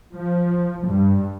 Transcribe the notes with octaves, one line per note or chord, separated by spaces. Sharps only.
F3
G2